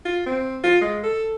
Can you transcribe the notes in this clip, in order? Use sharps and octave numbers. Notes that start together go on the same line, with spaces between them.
F4
C4
F4
G#3
A4